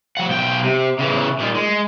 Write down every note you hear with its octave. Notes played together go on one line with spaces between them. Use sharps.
F3 F#5
B1 G5
C3
C#3 E3
A#2 D#3
G#3